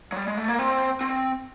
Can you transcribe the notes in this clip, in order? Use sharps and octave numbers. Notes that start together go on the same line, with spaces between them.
F#3
G3
G#3
A3
A#3
C4
C4